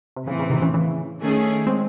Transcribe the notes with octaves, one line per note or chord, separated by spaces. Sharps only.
C3
A2 C#3 E3 C4
C#3
C3 D#3
C#3 E3
C#3 E3
D#3 A3 C#4 G#4
G#3 C4